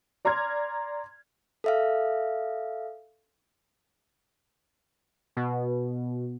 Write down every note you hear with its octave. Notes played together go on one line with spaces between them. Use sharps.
D5 A#5 C6 F6 G#6
A4 E5 F5
B2